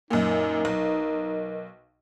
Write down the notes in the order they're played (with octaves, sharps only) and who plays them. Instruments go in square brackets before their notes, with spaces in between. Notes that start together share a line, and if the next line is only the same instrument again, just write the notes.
[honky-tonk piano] F#2 A#2 [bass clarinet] D#4 [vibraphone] A#4 D#5
[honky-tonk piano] B1